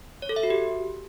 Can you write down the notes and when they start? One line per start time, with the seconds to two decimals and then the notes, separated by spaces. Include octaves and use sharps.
0.22 C#5
0.29 A4
0.36 E5
0.43 F#4
0.50 G4